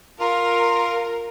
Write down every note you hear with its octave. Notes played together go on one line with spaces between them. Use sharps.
F4 A#4